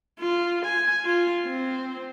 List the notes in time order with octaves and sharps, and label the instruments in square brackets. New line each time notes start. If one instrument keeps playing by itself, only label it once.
[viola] F4
G#5
F4
C4